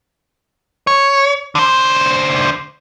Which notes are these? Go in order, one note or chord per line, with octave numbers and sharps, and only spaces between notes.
C#5
D3 C5